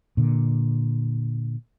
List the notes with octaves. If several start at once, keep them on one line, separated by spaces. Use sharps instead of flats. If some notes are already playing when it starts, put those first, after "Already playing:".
A#2 D3